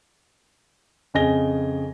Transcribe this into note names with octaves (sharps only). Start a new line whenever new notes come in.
F2 C#3 D#5 G#5 A#6 G7